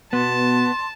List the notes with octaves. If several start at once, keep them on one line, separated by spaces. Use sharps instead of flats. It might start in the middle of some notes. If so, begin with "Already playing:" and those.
B2 B3 A5 C6